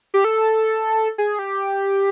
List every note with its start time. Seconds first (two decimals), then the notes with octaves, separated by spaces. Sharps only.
0.14 G4
0.24 A4
1.18 G#4
1.39 G4